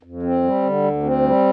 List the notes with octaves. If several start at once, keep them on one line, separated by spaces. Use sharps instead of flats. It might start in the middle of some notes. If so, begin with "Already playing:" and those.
F2
C4
G3
D3
D2
C4
G3